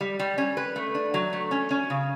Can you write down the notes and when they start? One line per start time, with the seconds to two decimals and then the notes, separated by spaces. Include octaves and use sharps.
0.01 G3
0.19 G3
0.38 C#4
0.57 B4
0.76 A3
0.95 D4
1.14 F#3
1.33 A3
1.51 C#4
1.71 C#4
1.90 C#3